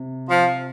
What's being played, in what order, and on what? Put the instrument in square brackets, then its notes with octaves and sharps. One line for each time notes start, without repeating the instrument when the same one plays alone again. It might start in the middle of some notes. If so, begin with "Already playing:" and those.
Already playing: [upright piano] C3
[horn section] F3